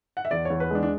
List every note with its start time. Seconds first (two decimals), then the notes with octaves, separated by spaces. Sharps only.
0.17 F#5
0.25 E5
0.31 E2 D5
0.45 E2 C#5
0.60 B4
0.70 G#3 D4
0.83 D4